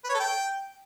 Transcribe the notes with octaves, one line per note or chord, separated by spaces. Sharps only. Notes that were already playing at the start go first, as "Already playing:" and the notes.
B4
C#5
A4
G5